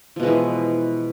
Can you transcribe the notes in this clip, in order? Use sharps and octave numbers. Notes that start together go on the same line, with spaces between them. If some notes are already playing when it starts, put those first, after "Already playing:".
B2 E3 F3 G#3